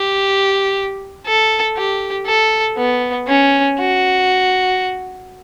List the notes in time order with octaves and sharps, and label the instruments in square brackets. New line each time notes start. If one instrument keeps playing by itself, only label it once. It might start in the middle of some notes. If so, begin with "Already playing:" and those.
Already playing: [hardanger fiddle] G4
A4
G4
A4
B3
C#4
F#4